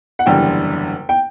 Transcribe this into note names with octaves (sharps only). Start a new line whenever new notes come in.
F#5
F#1 E2 D3 G3 G5
G5